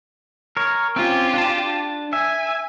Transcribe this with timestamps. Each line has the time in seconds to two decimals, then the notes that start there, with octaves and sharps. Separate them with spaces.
0.57 A#4 C#5
0.96 C4 C#4 F4 G4
1.34 D4 A5
2.13 E5 G#5